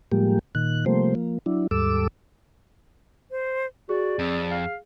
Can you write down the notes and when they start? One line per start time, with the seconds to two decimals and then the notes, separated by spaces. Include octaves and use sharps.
0.12 A2 F3 G3 G#3 A#3 G4
0.55 A#2 D#3 F#6
0.86 C3 F3 G3 A3 A#3 C5
1.15 F3 A#3
1.46 F#3 D4 E4
1.71 D#2 G#2 G3 A4 D6 E6
3.31 C5
3.89 F#4 G#4 D5
4.19 F2 C4
4.51 F5